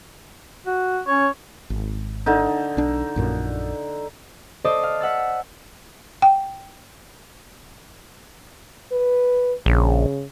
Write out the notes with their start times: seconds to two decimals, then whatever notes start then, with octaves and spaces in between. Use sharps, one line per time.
0.67 F#4
1.07 C#4 C#5
1.70 G#1
2.26 D3 D#4
2.77 B1 D4
3.16 A#1 F#2 A#2
4.64 A4 C5 D5 D#5 D#6
4.83 F5
5.00 E5 F#5 E6 A6
6.22 G5
8.92 B4
9.66 A#1 C#3